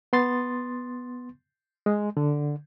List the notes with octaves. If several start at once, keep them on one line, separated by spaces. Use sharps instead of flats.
B3 C6 A6
G#3
D3